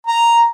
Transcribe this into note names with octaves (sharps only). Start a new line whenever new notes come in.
A#5